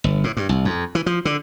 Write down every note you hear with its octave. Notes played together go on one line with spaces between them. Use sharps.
G1
A2
G2
C2
F2
E3
F3
D3